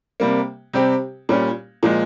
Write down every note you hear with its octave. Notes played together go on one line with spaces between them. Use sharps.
C3 G3 A#3
C3 G3 C4 G4
A#2 G3 C#4
A#2 F3 G#3